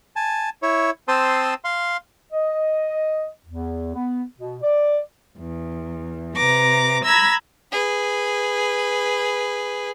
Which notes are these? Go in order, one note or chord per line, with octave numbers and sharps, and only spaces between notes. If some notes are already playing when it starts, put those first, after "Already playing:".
G#5 A5
E4 C#5
C4 C5 A5 C6 D#6 E6
F5 C6
D#5
E2
B3
B2
D5
E2
C3 B4 A#5 D6 A#6
A#5 B5 E6 G#6 A#6
G#4 B4